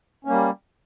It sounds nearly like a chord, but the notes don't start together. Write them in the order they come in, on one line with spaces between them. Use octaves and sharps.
C#4 A#3 G3